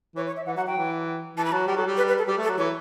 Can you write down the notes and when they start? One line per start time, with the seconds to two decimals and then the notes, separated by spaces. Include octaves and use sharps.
0.16 E3 C#5
0.27 C#5
0.37 E5
0.46 E3 F#5
0.57 F#3 F#5
0.67 F#3 G5
0.77 E3
1.37 E3 A5
1.45 B5
1.52 F#3 A5
1.67 G3 G5
1.77 F#3 A4
1.87 G3
1.97 B4
2.08 B4
2.18 A4
2.28 G3 G4
2.38 A3
2.43 A4
2.48 F#3
2.58 E3 C#5